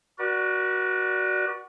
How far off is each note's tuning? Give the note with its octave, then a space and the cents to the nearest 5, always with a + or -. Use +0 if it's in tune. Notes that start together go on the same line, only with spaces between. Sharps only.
F#4 +10 B4 -45 D5 +10